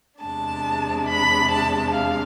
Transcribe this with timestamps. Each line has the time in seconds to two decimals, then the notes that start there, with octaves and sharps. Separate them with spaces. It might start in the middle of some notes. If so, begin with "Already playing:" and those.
0.20 E2 C3 G#3 D4 A5
1.07 B5
1.50 A5
1.93 F5